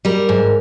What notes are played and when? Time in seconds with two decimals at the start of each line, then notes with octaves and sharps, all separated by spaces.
0.05 G3 A#4
0.29 G#2